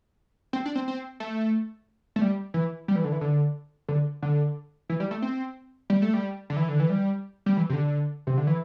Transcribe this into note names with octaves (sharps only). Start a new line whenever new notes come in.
C4
D4
C4
C4
A3
A3
G3
E3
G3
E3
D3
E3
D3
D3
D3
E3
G3
A3
C4
G3
A3
G3
D3
E3
D3
E3
G3
G3
E3
C3
D3
C3
D3
E3